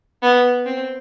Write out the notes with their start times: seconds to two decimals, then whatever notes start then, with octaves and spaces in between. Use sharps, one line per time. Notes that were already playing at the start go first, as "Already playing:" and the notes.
0.23 B3
0.66 C4